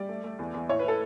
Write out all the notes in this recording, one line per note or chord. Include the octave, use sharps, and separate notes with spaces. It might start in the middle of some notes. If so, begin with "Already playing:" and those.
Already playing: G3 D5
A3
A3
E2
E2
A2 C#5
B4
A2 A4